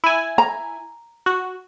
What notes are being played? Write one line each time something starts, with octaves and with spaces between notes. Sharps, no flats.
E4 G#5
A#5
F#4